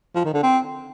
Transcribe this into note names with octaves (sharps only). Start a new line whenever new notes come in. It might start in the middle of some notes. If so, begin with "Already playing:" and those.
F3
D#3
D3
C4